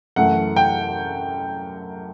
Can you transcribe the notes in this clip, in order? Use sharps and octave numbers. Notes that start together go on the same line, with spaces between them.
F#2 E3 A3 F#5
G5